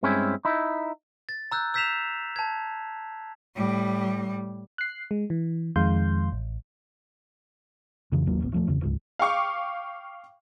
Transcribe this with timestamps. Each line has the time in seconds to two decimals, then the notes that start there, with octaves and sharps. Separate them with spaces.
0.03 G2 G#3 C4 C#4 E4
0.45 D#4 E4
1.29 A6
1.52 A#5 E6 F#6 G6
1.74 E6 G6 B6 C7 E7 F7
2.36 A5 G#6
3.56 A2 G3
4.78 F#6 C7
5.11 G#3
5.30 E3
5.76 F2 D#3 G#3 F5 C6 G6
6.32 A1
8.12 F2 C#3 E3
8.26 G#1 D#2 F#3 A#3
8.40 D1 A1 B3
8.52 D#1 F3 A3
8.67 D#1 E2 C#3
8.81 D1 C#2 G#2
9.19 F5 G5 C#6 D6